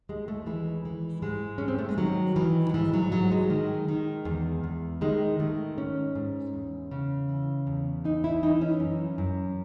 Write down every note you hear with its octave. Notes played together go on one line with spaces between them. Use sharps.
D#2 G#3
A3
E3 G#3
E3
G#2 G#3
G#2 C#4
C4
A3
G#3
D#3 F#3
D#3 E3
F#3
G#2 E3
F#3
G#2 F#3
G#3
D#3
D#3
E2
E2
D#3 G#3
D#3 A3
G#2 C#4
G#2
E2
C#3
E3
E2
E3 D#4
E4
E3 D#4
C#4
F#2
F#2